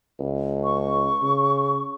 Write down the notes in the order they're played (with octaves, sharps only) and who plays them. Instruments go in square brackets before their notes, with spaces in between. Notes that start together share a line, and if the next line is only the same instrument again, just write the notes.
[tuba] C#2
[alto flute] C#6
[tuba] C#3